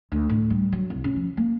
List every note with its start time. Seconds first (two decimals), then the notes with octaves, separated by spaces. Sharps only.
0.12 D2
0.29 A2
0.50 G3
0.72 F#3
0.90 C2
1.04 C#4
1.16 F3
1.37 A#3